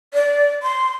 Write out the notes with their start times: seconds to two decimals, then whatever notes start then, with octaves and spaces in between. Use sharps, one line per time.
0.14 D5
0.63 C6